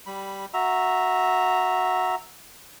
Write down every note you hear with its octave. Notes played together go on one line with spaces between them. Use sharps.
G3 B5
F#4 E5 A#5